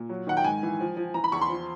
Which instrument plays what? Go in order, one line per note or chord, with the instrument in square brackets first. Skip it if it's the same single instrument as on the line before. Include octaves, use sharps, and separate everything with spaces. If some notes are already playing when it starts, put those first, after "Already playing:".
Already playing: [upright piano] A#2
F#3
D#3 F#5
G5
G#2 G#5
E3
F3
F3
E3 A#5
B5
E2 C#6
C6
F3